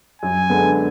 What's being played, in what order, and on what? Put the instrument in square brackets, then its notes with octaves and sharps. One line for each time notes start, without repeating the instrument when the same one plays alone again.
[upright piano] F#2 [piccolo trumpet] G#5
[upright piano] D3 G#3 B3